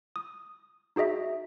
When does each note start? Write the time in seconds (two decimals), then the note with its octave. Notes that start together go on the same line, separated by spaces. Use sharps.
0.16 D#6
0.96 D#4 F#4 G#4 D#5 E5